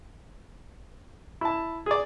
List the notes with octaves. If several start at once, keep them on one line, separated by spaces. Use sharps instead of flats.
E4 A5
G#4 D5